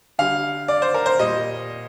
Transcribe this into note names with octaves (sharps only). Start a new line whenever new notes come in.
D3 G3 F5
D5
C5
A#4
C5
A#2 G3 D#5